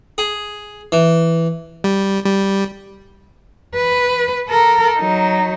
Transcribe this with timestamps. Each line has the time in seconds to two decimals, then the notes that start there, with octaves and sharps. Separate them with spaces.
0.18 G#4
0.92 E3
1.84 G3
2.25 G3
3.75 B4
4.49 A4 A#4
4.97 F#3 D#4